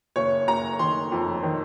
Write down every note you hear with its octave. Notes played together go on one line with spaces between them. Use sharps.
F#1 C#5
F#1 A#5
D#3 C6
F2
D#3